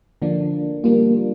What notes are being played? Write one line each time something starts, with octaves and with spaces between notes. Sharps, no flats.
D3 F3 A#3 D4
G3 A#3 D4 F4